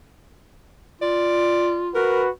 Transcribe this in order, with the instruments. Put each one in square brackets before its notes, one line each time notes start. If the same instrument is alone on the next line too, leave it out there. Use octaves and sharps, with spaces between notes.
[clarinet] F4 [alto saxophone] D5
[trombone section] F#4 B4 [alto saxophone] A#4